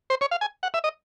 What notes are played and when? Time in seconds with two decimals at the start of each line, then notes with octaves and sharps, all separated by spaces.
0.10 C5
0.21 C#5
0.31 F5
0.41 G#5
0.63 F#5
0.74 E5
0.84 D#5